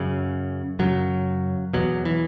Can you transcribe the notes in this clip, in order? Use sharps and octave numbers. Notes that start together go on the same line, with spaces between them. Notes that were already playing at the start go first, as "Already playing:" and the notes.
Already playing: F#2 C#3
F#2 C#3 F#3
E2 B2 F#3
E3